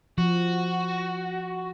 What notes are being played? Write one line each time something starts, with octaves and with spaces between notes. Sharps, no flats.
F3 F#4